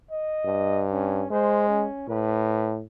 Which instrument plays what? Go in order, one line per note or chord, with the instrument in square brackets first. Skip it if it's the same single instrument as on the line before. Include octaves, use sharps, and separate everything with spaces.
[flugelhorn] D#5
[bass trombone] G2
[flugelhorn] C#4
[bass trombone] G#3 [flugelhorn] C5
[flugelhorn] C#4
[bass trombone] A2 [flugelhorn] B4